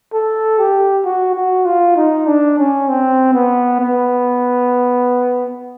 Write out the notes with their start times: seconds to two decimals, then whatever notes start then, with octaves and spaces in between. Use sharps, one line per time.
0.13 A4
0.59 G4
1.05 F#4
1.35 F#4
1.65 F4
1.96 D#4
2.27 D4
2.58 C#4
2.89 C4
3.34 B3
3.80 B3